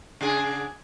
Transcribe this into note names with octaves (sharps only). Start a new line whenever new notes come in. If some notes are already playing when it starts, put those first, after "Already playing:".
C#3 D4 G#4